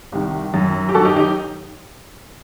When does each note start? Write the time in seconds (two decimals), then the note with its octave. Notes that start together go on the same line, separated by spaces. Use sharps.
0.12 C2 C3 D#3
0.54 F#2 D#3
0.89 G4
0.95 F#2 D#3 F#4 A4
1.05 D#4 G4
1.16 D#4 G4